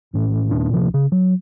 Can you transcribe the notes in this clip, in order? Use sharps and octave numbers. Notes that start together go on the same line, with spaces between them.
A#1 A2
D#2 A#2 D4
C#2 C3 F3
C#3
F#3